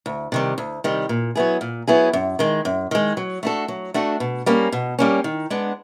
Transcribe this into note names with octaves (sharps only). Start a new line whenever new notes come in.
D2
C3 D#3 G3
D2
C3 D#3 G3
A#2
F#3 B3 E4 G#4
A#2
F#3 B3 E4 G#4
F#2
D#3 G#3
F#2
D#3 G#3
F#3
A3 D4 F#4 A4
F#3
A3 D4 F#4 A4
B2
G3 A#3 C#4
B2
G3 A#3 C#4
D#3
G#3 B3 D4